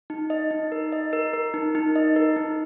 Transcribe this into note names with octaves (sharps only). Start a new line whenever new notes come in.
D#4
D#5
D#4
A#4
D#5
A#4
A#4
D#4
D#4
D#5
A#4
D#4